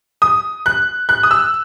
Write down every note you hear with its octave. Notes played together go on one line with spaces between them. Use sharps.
D#6
F#6
F#6
D#6
E6